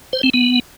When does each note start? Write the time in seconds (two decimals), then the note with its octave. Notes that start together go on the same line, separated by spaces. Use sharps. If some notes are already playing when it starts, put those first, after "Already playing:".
0.13 C5
0.23 C4
0.34 B3